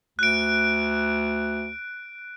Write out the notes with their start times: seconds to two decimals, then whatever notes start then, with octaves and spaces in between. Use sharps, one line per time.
0.19 D2 F#6 D7